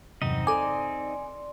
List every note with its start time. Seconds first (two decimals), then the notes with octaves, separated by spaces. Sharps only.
0.22 E2 G2 C3 F#3 C4 D#4 D#5
0.47 A4 D5 G#5 C6 D6